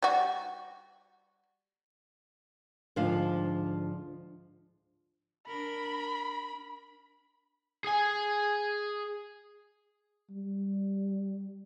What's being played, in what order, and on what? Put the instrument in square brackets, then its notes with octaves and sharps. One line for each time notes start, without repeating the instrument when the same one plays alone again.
[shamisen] G3 F#4
[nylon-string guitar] D2 G#2 F3 D4 F5
[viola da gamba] D4 A#4 [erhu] B5
[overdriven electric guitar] G#4 G#5
[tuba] G3